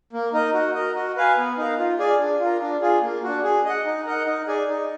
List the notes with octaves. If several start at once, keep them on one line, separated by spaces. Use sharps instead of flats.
A#3
D#4 A#4 D#5
F#4
A#4 D#5
F#4
B4 F5 G#5
B3
D#4 A#4 F5
F4
G#4 D5 G#5
D4
F4
A#4
D4
F4 G#4
A#3
D4 F#4
G#4
D#5 F#5
D#4
A#4 D#5 F#5
D#4
G#4 D5 G#5
D#4